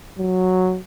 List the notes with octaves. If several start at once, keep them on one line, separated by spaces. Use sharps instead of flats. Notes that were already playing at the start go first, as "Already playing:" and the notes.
F#3